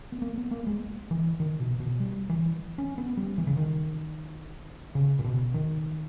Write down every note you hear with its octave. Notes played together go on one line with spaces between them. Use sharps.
B3
A#3
B3
A#3
G#3
E3
D#3
B2
B2
G3
E3
C#4
B3
G3
E3
C#3
D#3
C#3
A#2
B2
D#3